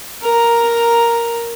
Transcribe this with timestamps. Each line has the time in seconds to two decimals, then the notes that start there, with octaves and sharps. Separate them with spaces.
0.22 A#4 A#5